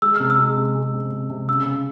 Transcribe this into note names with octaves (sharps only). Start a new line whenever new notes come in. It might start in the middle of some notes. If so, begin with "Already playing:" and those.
G#3 E6
C3 F6
E6
G#3
C3
G#3
C3
C3
C3
C#3 E6
C#3